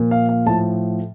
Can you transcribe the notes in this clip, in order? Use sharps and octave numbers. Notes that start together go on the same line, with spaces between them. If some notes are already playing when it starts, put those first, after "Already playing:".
Already playing: A#2 F3
F5
F5
A2 F3 A5